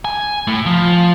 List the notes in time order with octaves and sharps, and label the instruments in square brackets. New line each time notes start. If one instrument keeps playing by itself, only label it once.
[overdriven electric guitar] G#5
A2
F3